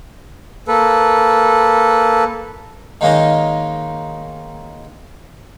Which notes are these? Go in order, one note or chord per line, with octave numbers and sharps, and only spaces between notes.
A#3 A4 B4
D#3 G#3 A#3 C#4 D#4